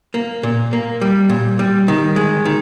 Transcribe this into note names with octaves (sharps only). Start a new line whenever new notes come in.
A#3
A#2
A#3
G3
A#2
G3
D#3
G#3
D#3